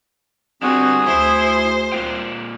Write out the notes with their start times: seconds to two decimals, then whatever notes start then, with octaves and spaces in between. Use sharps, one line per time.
0.63 G3 B3 C4 D4 F#4 G#4
1.07 D2 E4 C5
1.92 A#3 F4 G5